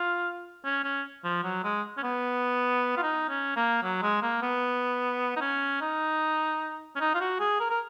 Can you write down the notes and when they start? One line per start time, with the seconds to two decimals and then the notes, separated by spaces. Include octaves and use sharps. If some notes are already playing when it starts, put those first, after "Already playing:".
Already playing: F4
0.65 C#4
0.84 C#4
1.24 F3
1.44 F#3
1.64 G#3
1.97 C#4
2.03 B3
2.97 F4
3.03 D#4
3.29 C#4
3.56 A#3
3.83 F#3
4.02 G#3
4.22 A#3
4.42 B3
5.36 D#4
5.41 C#4
5.81 D#4
6.96 C#4
7.00 D#4
7.15 F4
7.21 F#4
7.40 G#4
7.60 A#4
7.70 A#4